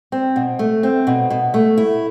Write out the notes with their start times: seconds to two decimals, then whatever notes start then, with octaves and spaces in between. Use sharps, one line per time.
0.12 C4
0.36 B2
0.59 A3
0.83 C4
1.07 B2
1.30 B2
1.54 A3
1.78 E4